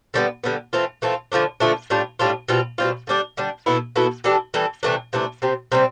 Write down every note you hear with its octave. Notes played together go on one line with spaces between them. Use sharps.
D3 G3 B3
D3 G3 B3
E3 A3 C4 F4
E3 A3 C4 F4
D3 F3 A3 D4
D3 F3 A3 D4
A2 G3 D4 F4
A2 G3 D4 F4
B2 G3 C4 F4
B2 G3 C4 F4
D3 G3 D4
D3 G3 D4
B2 B3 E4 A4
B2 B3 E4 A4
E3 G3 D4 A4
E3 G3 D4 A4
C3 E3 A3 D4
C3 E3 A3 D4
C3 G3 C4
C3 G3 C4